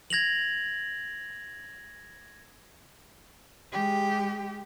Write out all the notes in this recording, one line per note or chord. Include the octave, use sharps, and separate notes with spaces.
G#6 A#6 F7 F#7
G#3 G4